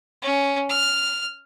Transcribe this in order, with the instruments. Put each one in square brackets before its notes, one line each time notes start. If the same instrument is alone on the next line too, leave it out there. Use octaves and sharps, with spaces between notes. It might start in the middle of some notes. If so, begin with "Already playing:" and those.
[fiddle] C#4
F6